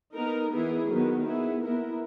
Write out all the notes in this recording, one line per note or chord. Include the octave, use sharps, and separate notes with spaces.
B3 D#4 A#4
E3 B3 E4 G#4
D#3 F#3 B3
B3 E4 G#4
B3 E4 A#4